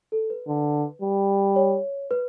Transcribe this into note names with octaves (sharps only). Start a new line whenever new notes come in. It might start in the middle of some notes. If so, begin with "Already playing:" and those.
A4
B4
D3
G3
C#5
B4